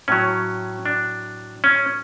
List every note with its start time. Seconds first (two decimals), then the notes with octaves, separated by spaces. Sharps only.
0.08 A2 F#3 C#4
0.86 D4
1.64 C#4